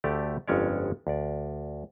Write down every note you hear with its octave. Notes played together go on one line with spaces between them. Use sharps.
D2 D3 A3 G4 D5
G1 F2 G#3 C#4 C#5 D5
D2 D5